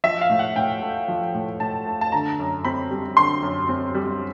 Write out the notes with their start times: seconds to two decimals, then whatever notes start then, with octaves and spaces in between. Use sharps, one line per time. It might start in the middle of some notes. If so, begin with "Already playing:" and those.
0.04 F3 E5
0.21 F5
0.30 A2
0.39 F#5
0.56 A2 G5
0.82 A3
1.08 F3
1.34 A2
1.60 A2 A5
1.87 A3
2.01 A5
2.12 D3 A#5
2.39 F#2
2.65 C4 B5
2.91 G3
3.17 D3 C6
3.43 F#2
3.69 C4
3.95 G3